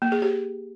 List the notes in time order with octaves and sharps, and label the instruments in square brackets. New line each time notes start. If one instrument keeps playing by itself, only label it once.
[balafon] A#3
G#4
G4